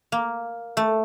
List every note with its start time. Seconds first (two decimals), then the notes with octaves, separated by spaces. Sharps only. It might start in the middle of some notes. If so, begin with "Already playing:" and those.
0.12 A#3
0.77 A3